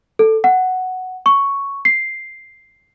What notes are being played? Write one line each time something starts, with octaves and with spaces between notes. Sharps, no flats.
A4
F#5
C#6
C7